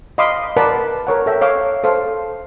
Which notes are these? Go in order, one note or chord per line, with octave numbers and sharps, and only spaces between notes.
D#5 F5 B5 C6 D6 D#6
A#4 B4 D5 F#5 A5 B5
A#4 C#5 F#5
A4 E5 G5
C#5 F5 D6
A4 C5 F5